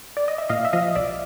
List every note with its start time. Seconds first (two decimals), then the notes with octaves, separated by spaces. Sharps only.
0.17 D5
0.28 D#5
0.38 E5
0.49 A#2 D#5 F5
0.65 E5
0.73 F3 D#5 F5
0.95 C2 D5 E5